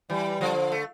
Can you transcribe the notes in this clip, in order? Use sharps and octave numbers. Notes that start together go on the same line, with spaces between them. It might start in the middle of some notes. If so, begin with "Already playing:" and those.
E3 G3
D3 F3
A3